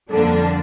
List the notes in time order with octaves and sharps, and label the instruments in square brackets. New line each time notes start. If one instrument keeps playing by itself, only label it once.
[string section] F2 D3 G3 A#3 D4 [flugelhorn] A4